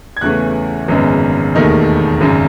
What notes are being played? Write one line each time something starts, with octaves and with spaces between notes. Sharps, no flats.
G#6
E2 C#3 E3 A3 C#4 F#6
G#1 F#2 C#3 G#3 B3
E1 D#2 D#3 A3 D#4
G#1 F#2 C#3